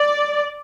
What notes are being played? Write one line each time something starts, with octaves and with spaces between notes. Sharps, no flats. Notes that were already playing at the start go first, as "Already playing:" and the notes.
Already playing: D5